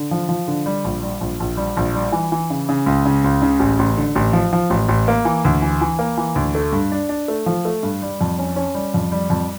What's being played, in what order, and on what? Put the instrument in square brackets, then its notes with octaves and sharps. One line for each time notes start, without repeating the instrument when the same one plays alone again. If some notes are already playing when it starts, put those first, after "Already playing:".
Already playing: [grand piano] D3
F3
F3
D3
G3
A#1
G3
A#1
A#1
G3
A#1
G3
E3
E3
C#3
C#3
C#2
C#3
C#2
C#3
A1
A1
D3
A1
F3
F3
A1
A1
A#3
E3
D2
E3
E3
A#3
E3
D2
A3
G2
D4
D4
A3
F3
A3
G2
G3
F2
C#4
C#4
G3
F2
G3
F2